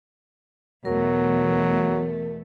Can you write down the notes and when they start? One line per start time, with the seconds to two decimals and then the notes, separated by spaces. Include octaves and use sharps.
0.85 E2 B2 F#3 A3 A#4